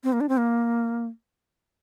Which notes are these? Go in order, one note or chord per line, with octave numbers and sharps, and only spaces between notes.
C4
A#3
D4
C4
A#3